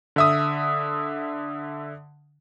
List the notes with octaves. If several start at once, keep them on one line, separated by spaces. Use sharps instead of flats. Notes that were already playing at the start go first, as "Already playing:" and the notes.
D3 E5 D#6